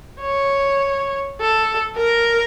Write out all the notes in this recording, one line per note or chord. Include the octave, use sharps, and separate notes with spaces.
C#5
A4
A#4